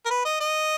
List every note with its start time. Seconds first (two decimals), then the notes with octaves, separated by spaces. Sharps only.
0.06 A#4
0.10 B4
0.25 D#5
0.41 D#5